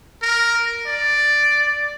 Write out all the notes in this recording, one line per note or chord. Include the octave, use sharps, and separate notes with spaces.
A#4
D5